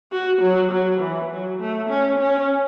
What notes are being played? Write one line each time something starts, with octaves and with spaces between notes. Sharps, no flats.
F#4
F#3
F#3
E3
F#3
A3
C#4
C#4